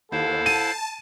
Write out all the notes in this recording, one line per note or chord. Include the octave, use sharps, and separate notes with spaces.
D#2 E4 A4 C5 F5 F#5
A5 D#7